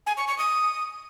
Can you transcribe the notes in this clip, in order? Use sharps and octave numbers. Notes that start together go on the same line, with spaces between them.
G#5
C#6
C#6
D#6